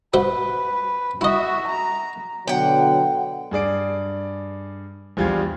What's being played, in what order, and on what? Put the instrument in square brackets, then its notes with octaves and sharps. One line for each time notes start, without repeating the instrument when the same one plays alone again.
[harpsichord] F#4 C5 E5 [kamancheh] B4
[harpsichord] E4 D#5 [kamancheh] F#4 E5
[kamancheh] A#5
[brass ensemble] B2 D3 F#3 [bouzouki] F#5 G5
[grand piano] G2 G#4 D5 D7
A#1 E2 G3 F4 G#4 G#6